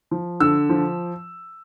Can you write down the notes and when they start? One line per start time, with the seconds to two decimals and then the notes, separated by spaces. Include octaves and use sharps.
0.11 F3
0.40 D3 E6
0.70 F3